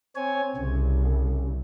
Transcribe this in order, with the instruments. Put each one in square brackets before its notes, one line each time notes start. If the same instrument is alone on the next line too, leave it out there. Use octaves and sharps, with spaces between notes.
[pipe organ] C4 C#5 G#5
[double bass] C2 [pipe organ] C#3